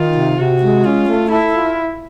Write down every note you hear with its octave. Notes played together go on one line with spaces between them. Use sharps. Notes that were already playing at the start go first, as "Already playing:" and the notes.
Already playing: D#3 F4
C3
C3 F#4
G#3
C#4 F4
A3
E4 A4
F4